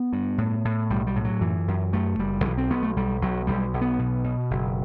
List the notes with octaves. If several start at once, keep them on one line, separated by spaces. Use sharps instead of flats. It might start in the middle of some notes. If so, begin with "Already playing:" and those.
Already playing: B3
G2
A2
A2
B1 G3
G3
A2
F#3
F#2 E3
F#2
F#2 A3
F#1 G3
B1 E3
C4
B1 B3
A3
B1 G3
B1 F#3
B1 G3
B1
B3
B2
B2
F#1